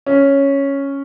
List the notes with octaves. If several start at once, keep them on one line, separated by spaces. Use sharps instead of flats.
C#4